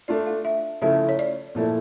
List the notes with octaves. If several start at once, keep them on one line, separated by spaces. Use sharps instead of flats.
A3 D4 F4 D5
F5
E5
C#3 F3 A3 E4 E5
C#5
D5
A#2 F3 A3 E4